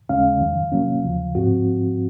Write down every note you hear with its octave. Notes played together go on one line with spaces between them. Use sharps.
D#2 C#3 G#3 C#4 F5
F2 D#3 F#3
C3 F#3 A#3 C#4
D#2 C#3 F3
G#2 F3 C4 F#4